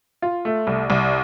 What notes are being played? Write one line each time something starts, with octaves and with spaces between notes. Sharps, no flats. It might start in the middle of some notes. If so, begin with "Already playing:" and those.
F4
A3
C2
C2